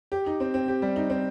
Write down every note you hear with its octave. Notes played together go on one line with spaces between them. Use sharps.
G4
D#4
C4
C4
G4
G3
D#4
C4